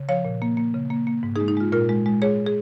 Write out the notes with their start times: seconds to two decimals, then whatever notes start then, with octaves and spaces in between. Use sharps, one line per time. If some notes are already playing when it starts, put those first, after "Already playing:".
Already playing: C#3
0.09 F3 C#5 F5
0.25 A#2
0.42 A#3
0.57 A#3
0.74 C#3
0.90 A#3
1.07 A#3
1.23 G#2
1.36 D#4 G#4
1.40 G#3
1.48 D#4
1.57 G#3 F4
1.72 A#2 F4 A#4
1.89 G#3
2.06 G#3
2.22 G#3 G#4 C#5
2.46 G#4